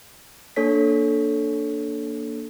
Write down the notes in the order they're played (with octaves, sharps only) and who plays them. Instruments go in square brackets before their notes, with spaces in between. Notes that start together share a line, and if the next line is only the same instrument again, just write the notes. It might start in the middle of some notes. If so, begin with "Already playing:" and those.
[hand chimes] A#3 D4 A4 C#5 B6